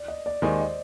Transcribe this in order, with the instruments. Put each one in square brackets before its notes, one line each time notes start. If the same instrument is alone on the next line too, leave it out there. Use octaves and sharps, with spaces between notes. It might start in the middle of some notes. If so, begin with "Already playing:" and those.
Already playing: [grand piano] D5
D#5
D5
[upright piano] D#2 D#3 G#3 D#4 G#4 [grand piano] C5
[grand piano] D#5